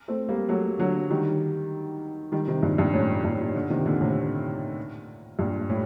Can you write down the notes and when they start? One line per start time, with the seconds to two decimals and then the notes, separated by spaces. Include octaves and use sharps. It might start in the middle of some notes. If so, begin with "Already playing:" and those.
0.08 A3 C4
0.29 G3 A#3
0.49 F#3 A3
0.79 D3 F#3
1.10 D#3 G3
2.32 D#3 G3
2.47 C3 D#3
2.63 G2 A#2
2.78 G2 A#2
2.93 F#2 A2
3.24 G2 A#2
3.55 A#2 D3
3.70 C3 D#3
3.86 A#2 D3
4.01 A2 C3
5.39 G2 A#2
5.69 A2